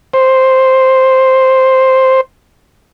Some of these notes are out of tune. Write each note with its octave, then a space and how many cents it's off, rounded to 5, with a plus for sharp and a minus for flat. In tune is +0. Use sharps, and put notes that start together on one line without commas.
C5 +0